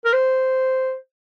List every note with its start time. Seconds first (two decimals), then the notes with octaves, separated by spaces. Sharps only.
0.05 A#4
0.13 C5